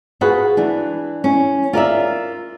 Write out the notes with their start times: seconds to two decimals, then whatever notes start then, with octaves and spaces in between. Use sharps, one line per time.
0.21 F4 F#4 G#4 B4
0.57 E3 D4
1.24 C#4
1.73 F4 A#4 D5 E5